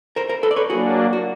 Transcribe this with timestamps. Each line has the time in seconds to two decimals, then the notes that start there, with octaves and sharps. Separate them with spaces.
0.16 A#4 C5
0.29 A#4 C5
0.43 A4 B4
0.51 D5
0.56 B4 C#5
0.69 F#3 A#3 D4 F#4 G#4
1.13 F#4